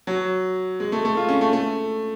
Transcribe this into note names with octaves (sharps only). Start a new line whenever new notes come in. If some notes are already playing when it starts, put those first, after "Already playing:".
F#3
G#3
A3
A3
F4
C#4
A3
A3